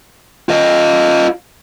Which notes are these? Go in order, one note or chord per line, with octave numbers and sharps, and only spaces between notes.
F4 D#5